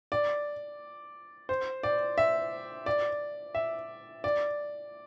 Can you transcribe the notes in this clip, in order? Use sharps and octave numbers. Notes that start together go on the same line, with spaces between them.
D5
C5
D5
E5
D5
E5
D5